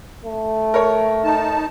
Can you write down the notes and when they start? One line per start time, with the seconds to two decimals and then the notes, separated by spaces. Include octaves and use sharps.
0.25 A3
0.74 A#4 C#5
1.24 D#4 A5